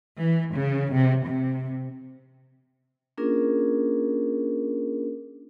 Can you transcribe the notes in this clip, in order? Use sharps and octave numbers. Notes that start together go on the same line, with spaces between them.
E3
C#3
C3
C3
A#3 C#4 D4 F4 G#4 A#4